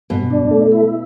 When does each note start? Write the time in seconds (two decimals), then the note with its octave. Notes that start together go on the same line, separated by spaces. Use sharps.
0.10 G2 B2
0.30 D4
0.51 A3
0.72 E4